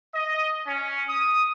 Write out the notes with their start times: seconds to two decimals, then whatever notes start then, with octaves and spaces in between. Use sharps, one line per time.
0.14 D#5
0.66 C#4
1.09 D#6